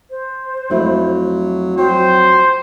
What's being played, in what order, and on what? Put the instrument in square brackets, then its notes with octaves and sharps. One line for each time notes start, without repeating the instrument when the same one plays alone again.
[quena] C5
[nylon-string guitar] F2 A3 E4 [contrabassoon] F#3
[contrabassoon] F#3 [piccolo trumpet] C5 [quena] G5